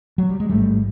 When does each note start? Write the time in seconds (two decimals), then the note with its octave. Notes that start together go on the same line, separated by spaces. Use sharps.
0.18 F#3
0.29 G3
0.40 G#3
0.49 A1 G#2 G3 A3